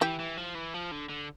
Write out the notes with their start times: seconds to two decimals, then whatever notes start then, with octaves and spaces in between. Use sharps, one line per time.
0.01 E3 E4 G4
0.20 E3
0.37 F3
0.55 E3
0.74 F3
0.91 D3
1.09 D3